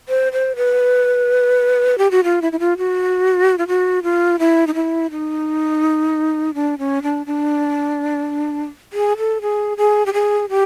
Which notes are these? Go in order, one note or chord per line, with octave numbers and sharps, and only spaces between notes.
C5
C5
B4
G4
F#4
F4
E4
E4
F4
F#4
F4
F#4
F4
E4
D#4
E4
D#4
D4
C#4
D4
D4
G#4
A4
G#4
G#4
G4
G#4
G4